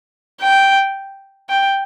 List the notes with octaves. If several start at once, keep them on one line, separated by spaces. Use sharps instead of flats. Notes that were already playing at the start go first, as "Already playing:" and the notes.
G5
G5